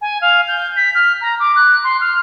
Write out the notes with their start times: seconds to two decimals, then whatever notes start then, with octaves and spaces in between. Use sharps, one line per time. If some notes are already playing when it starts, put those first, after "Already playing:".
0.01 G#5
0.21 F5
0.48 G6
0.76 B6
0.95 F6
1.21 A#5
1.40 D6
1.56 F#6
1.84 C6
2.01 F6